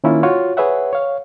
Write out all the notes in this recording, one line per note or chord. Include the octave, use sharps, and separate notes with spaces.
D#3 A#3 C#4 E4 F4
F4 F#4 C#5
G#4 B4 C#5 E5 F#5
C#5 F5